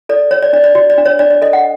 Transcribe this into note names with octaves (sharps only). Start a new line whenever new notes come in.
A4 D5
C#5
D5
D4 D5
D5
F#4 D5
D5
D4
C#5
D4 D5
D5
A4 D#5
F#5